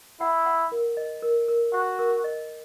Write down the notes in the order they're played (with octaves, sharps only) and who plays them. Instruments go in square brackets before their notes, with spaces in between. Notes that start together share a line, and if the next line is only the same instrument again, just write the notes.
[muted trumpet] E4 [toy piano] F#5
[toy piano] F#5
A#4
D#5
A#4
A#4
[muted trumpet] F#4 [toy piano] F#5
[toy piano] A#4
D#5